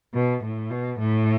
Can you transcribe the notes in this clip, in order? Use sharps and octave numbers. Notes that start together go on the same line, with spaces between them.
B2
A2
B2
A2